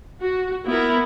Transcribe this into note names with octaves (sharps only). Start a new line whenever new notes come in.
F#4
B3 E4 A#4